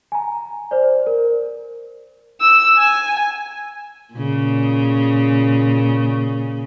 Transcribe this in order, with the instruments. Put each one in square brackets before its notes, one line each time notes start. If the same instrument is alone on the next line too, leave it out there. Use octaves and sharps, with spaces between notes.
[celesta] G#5 A#5
C5 D5
A#4
[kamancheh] E6
G#5
[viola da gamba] A#2 C#3